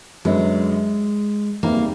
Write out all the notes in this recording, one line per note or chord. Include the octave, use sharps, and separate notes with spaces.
F#2 D3 F#3 G#3 B3
E2 C3 D#3 G3 A#3